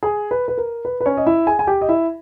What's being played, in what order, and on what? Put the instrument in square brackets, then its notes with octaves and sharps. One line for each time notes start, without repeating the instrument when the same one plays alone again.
[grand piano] G#4 G#5
B4
B4
A#4
B4
B4
C#4 C#5
D#5
E4 E5
G#4 G#5
G#5
G4 G5
D#5
E4 E5